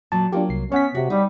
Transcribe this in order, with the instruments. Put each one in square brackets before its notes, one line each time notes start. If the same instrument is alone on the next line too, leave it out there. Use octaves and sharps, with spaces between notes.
[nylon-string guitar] A#2 F#3 [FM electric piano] A5
[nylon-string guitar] F#3 A#3 [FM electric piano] D4 F4 G4
[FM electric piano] C2 C7
[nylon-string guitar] B3 [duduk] C#4 [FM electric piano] C#5 F#5 B6
[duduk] C3 [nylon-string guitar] F#4
[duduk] G3 [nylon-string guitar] D#4